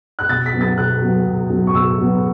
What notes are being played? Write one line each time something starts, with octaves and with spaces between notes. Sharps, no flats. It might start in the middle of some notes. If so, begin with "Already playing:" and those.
F#6
B2 A6
B6
F#3 B3
A6
B2 F#6
F#3 B3
B2
F#3 B3
C#6
B2 E6
F#3 B3